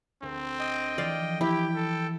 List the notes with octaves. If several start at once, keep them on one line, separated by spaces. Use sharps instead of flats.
D2 C4 A#4
D#5 G5
E3 F3 A3 D5 F5
E4 G4 G5
A4